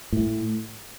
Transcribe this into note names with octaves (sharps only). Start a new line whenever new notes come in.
A2